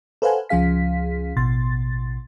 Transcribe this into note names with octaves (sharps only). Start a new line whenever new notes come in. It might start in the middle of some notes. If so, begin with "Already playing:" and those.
A4 B4 C5 F5 F#5 G#5
C#2 F3 C#4 G#4 F5 B6
A1 B2 C6 A6